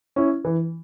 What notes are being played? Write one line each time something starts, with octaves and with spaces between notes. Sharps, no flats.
C#4 E4
E3